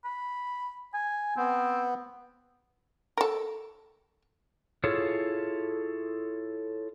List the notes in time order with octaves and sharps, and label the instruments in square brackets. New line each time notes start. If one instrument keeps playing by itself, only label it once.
[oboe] B5
G#5
[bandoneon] B3 [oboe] C4
[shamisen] A4 A#4
[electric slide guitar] E4 F4 G#4 A4 C#5